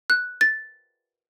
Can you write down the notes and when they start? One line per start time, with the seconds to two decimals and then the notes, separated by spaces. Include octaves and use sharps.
0.10 F#6
0.41 A6